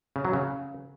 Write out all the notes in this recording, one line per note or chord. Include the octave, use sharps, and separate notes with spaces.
C#3
F#3
C#3